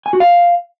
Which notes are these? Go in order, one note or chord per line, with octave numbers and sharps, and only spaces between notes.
G#5
F#4
F5